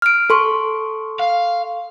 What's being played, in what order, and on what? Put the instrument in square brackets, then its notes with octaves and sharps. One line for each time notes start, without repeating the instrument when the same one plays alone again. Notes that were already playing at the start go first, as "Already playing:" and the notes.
[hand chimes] F6 D7
A4 C6 C#6
[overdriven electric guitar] F5